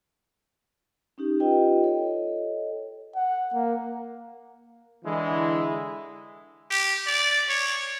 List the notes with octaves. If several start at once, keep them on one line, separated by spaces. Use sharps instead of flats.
C#4 D#4 G4
F4 G4 B4 D#5 G5
A4 C#5 D#5
F#5
A#3
D3 E3 G#3 E4
G4
D5
C#5